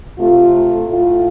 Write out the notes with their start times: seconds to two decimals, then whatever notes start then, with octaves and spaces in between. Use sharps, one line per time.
0.18 C3 A3 F4
0.86 A2 A3 F4